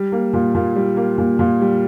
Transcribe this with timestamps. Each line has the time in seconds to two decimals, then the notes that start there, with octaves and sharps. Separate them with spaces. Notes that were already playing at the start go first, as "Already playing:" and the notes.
Already playing: G3
0.12 A#3
0.33 A#2
0.54 A#2
0.76 G3
0.97 A#3
1.18 A#2
1.39 A#2
1.61 G3